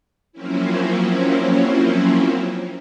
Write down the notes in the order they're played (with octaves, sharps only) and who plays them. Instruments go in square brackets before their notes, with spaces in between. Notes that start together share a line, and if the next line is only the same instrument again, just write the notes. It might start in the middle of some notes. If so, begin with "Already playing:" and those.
[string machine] F3 F#3 A#3 C4 C#4 E4